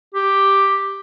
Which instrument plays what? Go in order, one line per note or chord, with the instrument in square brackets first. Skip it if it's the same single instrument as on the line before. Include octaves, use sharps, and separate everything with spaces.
[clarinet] G4